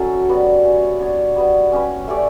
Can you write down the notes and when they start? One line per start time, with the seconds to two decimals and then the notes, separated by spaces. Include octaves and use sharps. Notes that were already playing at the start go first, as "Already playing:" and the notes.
Already playing: F#3 C#4 E4 F#4 A4 E5
0.29 G3 B3 F#4 B4
0.64 C#4 F#4 C#5 E5
1.00 B3 D4 F#4 C#5
1.36 G3 B3 F#4 B4
1.72 C#4 G4 B4
2.08 A3 C#4 G4 D5